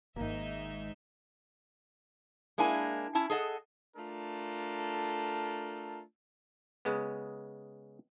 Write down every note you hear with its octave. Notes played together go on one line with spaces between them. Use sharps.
D#1 G#1 G#2 A#3 D#4 E5
G#3 A#3 D4 E4 G#5
C#4 E4 A5
G#4 A4 D#5 F#5
A3 D4 F4 A4 A#4
C#3 G#3 B3